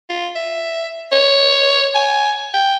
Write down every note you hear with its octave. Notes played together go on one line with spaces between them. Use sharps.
F4
E5
C#5
G#5
G5